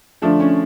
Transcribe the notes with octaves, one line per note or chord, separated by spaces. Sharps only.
D3 F3 A3 D4
C#4